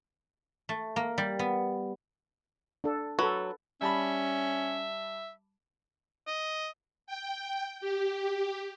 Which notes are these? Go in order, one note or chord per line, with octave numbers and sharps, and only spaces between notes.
A3
A#3
G3
B3
D4 A4
F#3 A4 B4
G3 C#4 E5 A5 B5
D#5
G5
G4